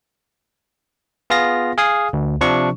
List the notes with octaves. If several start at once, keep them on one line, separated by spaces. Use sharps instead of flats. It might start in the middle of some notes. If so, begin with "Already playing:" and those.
B3 F4 G#4 F5 A#6
G#4 F5 G#5 D#6
D2
C3 F3 D4 C#6